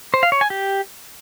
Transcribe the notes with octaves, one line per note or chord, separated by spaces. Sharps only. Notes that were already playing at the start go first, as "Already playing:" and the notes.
C5
F5
C#5
G#5
G4